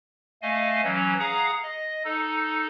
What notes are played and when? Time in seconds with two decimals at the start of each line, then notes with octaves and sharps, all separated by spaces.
0.42 A3 D#5 F5 G#5
0.84 E3 F#3 C#4
1.19 G#4 F5 F#5 A#5 D#6
1.63 D#5
2.05 D#4 A4